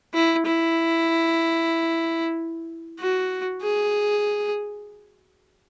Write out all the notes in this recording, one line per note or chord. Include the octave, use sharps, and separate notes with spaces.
E4
E4
F#4
G#4